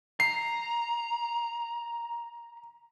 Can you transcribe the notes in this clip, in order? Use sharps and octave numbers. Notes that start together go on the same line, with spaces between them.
A#5 C7